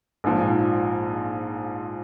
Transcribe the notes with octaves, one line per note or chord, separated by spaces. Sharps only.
A#1 G#2 F3